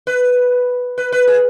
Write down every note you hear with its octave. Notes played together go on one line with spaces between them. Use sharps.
B4
B4
B4
G#4